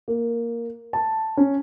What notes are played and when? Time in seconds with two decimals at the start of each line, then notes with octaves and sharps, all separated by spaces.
0.08 A#3
0.93 A5
1.37 C#4